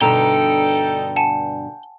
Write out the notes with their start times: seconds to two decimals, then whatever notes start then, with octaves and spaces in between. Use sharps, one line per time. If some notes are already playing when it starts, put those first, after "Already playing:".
0.01 G2 B2 D3 D#4 A4 G5 A#5
1.16 F#5 G#5 A5